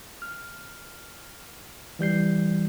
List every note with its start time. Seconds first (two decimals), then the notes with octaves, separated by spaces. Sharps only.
0.22 F6
1.99 E3 G3 G6 C7